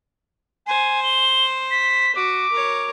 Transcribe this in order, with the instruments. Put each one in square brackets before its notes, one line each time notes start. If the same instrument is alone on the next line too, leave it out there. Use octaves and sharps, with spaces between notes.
[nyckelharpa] C5 [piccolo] G#5
[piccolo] G7
B6
[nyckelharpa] F#4 [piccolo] D6
[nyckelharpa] A#4 C#5